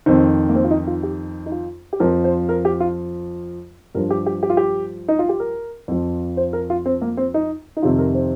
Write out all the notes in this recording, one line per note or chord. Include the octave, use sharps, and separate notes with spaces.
F2 D#3 C4
A#3
C4
F4
D#4
F4
G4
D#4
F4
G4
F2 F3 A#4
C5
A#4
G4
F4
G2 F3 A#4
G4
G4
G4
F4
G4
D#4
F4
G4
A#4
F2 F3
C5
A#4
F4
C4
A#3
C4
D#4
D#4
F2 C3 D#3 F4
A#4
C5